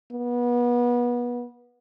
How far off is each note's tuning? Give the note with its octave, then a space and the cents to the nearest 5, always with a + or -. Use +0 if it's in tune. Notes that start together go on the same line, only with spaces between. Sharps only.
B3 -30